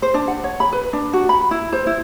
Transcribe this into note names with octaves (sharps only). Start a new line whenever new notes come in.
C5
D4
F#5
C#5
B5
B4
D4
F#4
B5
E4
C5
E4